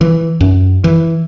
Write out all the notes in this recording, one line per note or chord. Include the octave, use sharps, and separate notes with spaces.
E3
F#2
E3